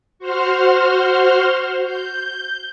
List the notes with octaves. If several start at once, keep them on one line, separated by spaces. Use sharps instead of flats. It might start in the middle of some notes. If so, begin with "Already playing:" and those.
F#4 C5 C6 F6
G6